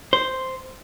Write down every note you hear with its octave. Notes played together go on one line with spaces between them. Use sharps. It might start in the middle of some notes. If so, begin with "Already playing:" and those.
C5